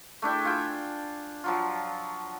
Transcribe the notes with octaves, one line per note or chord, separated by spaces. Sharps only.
A3 D4 E4 G5
F4 G5 G#5
F3 F#3 F4